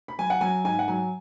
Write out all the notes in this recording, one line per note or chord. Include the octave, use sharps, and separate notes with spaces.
B5
F#3 G#5
F#5
F#3 G#5
G#2 G#5
F#5
F#3 G#5